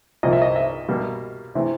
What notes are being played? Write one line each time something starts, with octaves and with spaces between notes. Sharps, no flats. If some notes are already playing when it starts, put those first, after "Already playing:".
C2 A#2 F3 A#3 D#5
E5
D#5
E5
B2 G3 A#3
C3 E3 A3